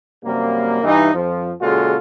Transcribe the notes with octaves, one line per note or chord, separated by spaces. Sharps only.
F#2 C3 G3 A#3
G2 E3 D#4
F2 F3
A#2 C#3 G#3 F4 F#4 A4